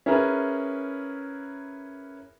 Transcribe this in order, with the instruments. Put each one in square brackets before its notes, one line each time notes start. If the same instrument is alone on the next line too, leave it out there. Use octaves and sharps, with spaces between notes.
[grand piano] C#4 E4 G#4 A#4 B4